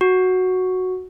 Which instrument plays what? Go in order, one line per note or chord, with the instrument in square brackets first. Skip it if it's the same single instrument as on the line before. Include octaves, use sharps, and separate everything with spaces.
[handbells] F#4